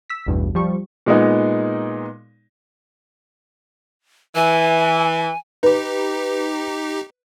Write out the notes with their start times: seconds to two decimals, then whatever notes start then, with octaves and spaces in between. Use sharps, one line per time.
0.10 E6 B6
0.26 A1 E2 G2 B2
0.55 F3 G3 C#6
1.06 A#2 G#3 B3 D#4
4.35 E3 G#5
5.63 D#4 G4 B4